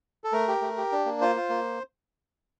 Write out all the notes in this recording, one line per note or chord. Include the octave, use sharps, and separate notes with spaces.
A4
A3 A#4
G4
A3
G4
D4
A#3
F4 C5
F4
A#3